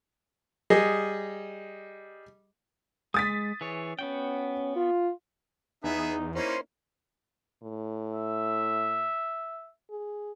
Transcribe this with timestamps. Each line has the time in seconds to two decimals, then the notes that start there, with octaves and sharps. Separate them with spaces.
0.70 G3 G#4 D#5
3.14 G#3 D#6 A6 B6
3.61 E3 G#4 C#5
3.99 B3 C#4 F#4 G5
4.76 F4
5.84 E2 B3 D#4 G#4 E5
6.35 A#3 C#4 D#4 E4 C5 C6
7.63 A2
8.14 E5
9.91 G#4